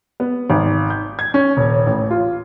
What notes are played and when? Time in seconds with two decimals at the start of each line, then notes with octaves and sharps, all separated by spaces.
0.20 B3
0.50 G#1
0.90 G6
1.19 G#6
1.34 C#4
1.57 D#1
1.87 A1
2.11 F4